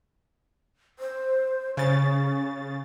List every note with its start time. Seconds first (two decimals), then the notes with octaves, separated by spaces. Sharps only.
0.99 C5
1.77 C#3 C#4 A6